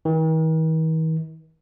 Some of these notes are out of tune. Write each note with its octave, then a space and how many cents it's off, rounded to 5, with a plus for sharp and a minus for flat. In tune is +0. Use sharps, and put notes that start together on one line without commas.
D#3 +45